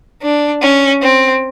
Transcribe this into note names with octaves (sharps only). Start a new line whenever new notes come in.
D4
C#4
C4